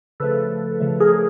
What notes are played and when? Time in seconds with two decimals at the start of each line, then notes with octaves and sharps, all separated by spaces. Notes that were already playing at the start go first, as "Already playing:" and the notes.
0.20 C#3 F3 A3 A4 B4
0.80 C#3 F3 A3
1.00 G#4 A#4